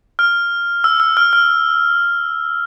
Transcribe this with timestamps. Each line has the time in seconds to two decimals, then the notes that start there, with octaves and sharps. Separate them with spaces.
0.19 F6
0.84 E6
1.00 E6
1.17 F6
1.33 F6